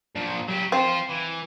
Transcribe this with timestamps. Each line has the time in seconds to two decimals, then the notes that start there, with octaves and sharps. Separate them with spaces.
0.16 A#2 F3
0.48 F#3 G4
0.72 C4 F4 C5
1.09 E3